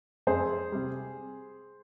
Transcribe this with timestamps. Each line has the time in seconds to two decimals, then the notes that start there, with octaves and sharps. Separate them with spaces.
0.27 F2 G#4 C5
0.72 C3 G3